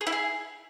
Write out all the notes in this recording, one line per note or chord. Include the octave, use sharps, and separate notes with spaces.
G#4
E4
G#4